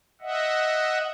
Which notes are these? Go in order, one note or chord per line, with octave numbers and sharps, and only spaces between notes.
D#5 E5 F#5